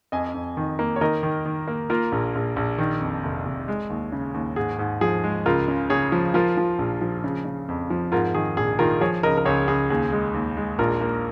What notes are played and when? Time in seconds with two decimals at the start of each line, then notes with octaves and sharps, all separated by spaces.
0.12 F2 D#5 G#5
0.34 F2
0.57 D#3
0.79 A#3
0.96 C#5
1.01 D#3 A#4 D#5
1.23 D#3
1.45 D#3
1.68 A#3
1.90 A#3 F4 A#4
2.12 A#1
2.35 A#1
2.56 A#1
2.78 D#3
3.01 F2
3.23 F1
3.46 F1
3.68 G#3
3.90 D#2
4.12 C#3
4.34 D#2
4.56 G#2 G#4
4.79 G#2
5.01 F3 G#4
5.24 G#3
5.46 C#2 F4 A#4
5.68 C#3
5.90 C#3 G#4 C#5
6.12 F3
6.34 F3 F4 A#4
6.57 F3
6.79 A#1
7.01 F3
7.24 C#3
7.45 C#3
7.69 F2
7.90 F3
8.12 G#2 F4 A#4
8.34 D#3 G#4
8.57 A#1 G#4
8.79 D#3 F4 A#4
9.01 F3 G#4 C#5
9.23 C#2 A#4 D#5
9.37 A#4
9.45 C#2 G#4 C#5
9.67 C#2 G#4
9.90 D#2 G#4
10.12 G#3
10.34 D#2
10.57 G#3
10.78 A#1 F4 A#4
11.01 A#3